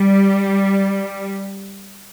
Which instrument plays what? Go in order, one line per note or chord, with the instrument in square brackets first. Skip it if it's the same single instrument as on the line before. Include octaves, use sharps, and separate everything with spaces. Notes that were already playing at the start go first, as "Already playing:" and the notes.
Already playing: [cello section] G3